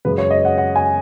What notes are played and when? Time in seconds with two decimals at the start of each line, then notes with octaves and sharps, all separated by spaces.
0.05 F#2 C#3 G#3 B4
0.18 C#5
0.31 D#5
0.45 F#5
0.58 F#5
0.76 G#5